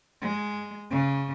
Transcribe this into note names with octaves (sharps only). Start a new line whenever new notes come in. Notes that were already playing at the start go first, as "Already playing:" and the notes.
G#3
C#3